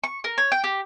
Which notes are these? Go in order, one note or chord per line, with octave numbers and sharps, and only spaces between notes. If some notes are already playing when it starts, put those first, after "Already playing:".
C#6
A#4
C#5
G5
G4